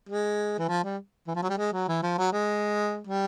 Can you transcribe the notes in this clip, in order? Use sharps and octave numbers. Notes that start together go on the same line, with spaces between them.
G#3
E3
F3
G3
E3
F3
F#3
G3
G#3
F#3
E3
F3
F#3
G#3
G3